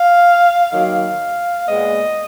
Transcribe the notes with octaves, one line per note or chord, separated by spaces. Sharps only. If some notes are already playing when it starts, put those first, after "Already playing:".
Already playing: F5
D#3 F#3 A#3 F5
A#2 G#3 B3 D#5